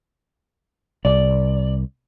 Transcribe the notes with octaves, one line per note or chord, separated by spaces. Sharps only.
C2 D5